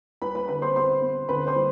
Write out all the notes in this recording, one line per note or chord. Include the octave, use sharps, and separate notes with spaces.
G3 B4 B5
B4 B5
D3 B4 B5
C5 C6
B3 C5 C6
B3
D3 B4 B5
C5 C6
G3